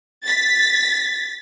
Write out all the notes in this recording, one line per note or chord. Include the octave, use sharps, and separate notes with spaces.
A6 B6